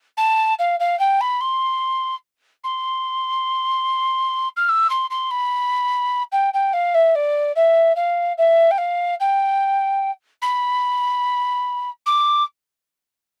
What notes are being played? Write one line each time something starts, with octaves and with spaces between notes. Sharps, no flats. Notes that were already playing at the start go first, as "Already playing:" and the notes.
A5
F5
F5
G5
B5
C6
C6
F6
E6
C6
C6
B5
G5
G5
F5
E5
D5
E5
F5
E5
G5
F5
G5
B5
D6